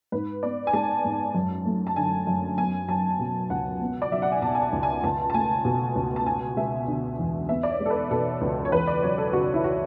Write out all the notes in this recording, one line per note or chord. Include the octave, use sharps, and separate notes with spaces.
G#2 B4
B3 D5
G#5
G#3 A5
G#2
F#2
A3
A5
D3 G#5
F#2
B3 G#5
F#3 A5
B2
C#2 F#5
B3
D5
F#3 E5
F#5
G#5
B2 A5
G#5
A5
C#2
G#5
C#2 A5
A5
A3 G#5
B2
C#2
A5
B3 G#5
G#3 E5
D3
E2
B3 E5
D5
C#5
G#3
A4
B4
B2 A4
C#2
C#5
E2 B4
D5
F#3 C#5
A4
C#3 F#4
E4
F#4